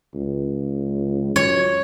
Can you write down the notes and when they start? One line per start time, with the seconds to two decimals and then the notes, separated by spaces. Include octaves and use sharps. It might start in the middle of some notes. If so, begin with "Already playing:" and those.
0.15 C#2
1.36 F#2 C#5